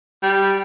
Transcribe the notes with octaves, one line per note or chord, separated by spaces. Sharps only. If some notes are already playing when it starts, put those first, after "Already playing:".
G3